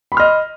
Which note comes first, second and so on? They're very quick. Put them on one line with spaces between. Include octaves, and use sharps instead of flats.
B5 C6 F6 D#5